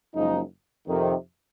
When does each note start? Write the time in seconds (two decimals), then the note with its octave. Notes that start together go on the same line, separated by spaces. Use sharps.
0.14 F#1 F#2 F3 G#3 D#4
0.88 F2 C3 D#3